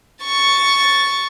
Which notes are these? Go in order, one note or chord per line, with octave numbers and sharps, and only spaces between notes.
C#6 A6